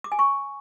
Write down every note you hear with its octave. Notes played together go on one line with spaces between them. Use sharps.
D6
G#5
C#6